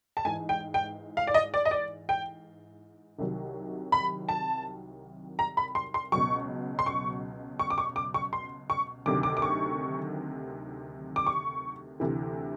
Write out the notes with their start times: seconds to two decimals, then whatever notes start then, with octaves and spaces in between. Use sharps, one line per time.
0.17 A5
0.25 G#2 E3 G#5
0.49 G5
0.74 G5
1.17 F5
1.27 D5
1.34 D#5
1.54 D5
1.65 D#5
1.71 D5
2.09 G5
3.18 C2 C3 D#3 F#3
3.92 B5
4.29 A5
5.39 A#5
5.57 B5
5.75 C6
5.94 C6
6.12 C#2 B2 F#3 C#6
6.79 C6
6.86 C#6
7.60 C#6
7.70 D6
7.78 C#6
7.96 D6
8.14 C#6
8.33 C6
8.70 C#6
9.06 D2 C3 D#3 F#3 D6
9.23 D6
9.37 D6
9.42 C#6
11.16 D6
11.27 C#6
12.00 D2 C3 E3